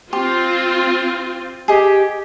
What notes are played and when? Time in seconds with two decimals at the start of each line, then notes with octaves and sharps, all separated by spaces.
0.13 C4 F4 G4 C6
1.68 G4 G#4 D#5